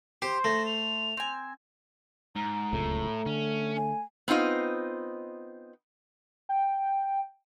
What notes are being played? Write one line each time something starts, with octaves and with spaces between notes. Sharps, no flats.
G4 C5
A3 A#6
F7
C4 G#5
G#2 A#5
D1 C#2 F#2 A2 A3
D3 C#4
G#5
B3 C4 D#4 F4 D#5
G5